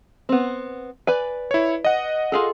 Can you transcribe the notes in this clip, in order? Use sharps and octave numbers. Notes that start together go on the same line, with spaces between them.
B3 C4
B4 D5 G#5
E4 C#5
D#5 F#5
F4 G#4 A4